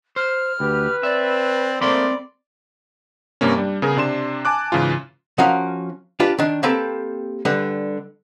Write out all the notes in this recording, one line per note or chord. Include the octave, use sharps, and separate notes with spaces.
C5 F6
D2 G4 B4
C4 D5 E5
A3 A#3 C4 C5 D5 B5 C6
G2 C3 A#3 C#4
G3 D4
C#3 B3 G#4 A#4
C3 D4 C6 E7
G#5 A5 D6 F#6
G#2 C#3 E3 F4
F3 C#4 F#4 A#4 F5
D4 F4 G4 B4 D5
D#3 D4
A#3 C4 G4 A4 B4
D3 G3 B4